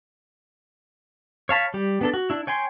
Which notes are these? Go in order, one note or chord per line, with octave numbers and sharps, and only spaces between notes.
C#5 F5 A5 B5
G3 G4
B3 D4 A4
F#4
D4 E4
C#5 G5 G#5 C6